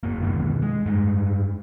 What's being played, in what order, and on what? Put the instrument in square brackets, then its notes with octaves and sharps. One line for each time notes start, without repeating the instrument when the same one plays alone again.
[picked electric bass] F#2 A#3
B2 D#3 E3 G#3
G#3
G2 G#3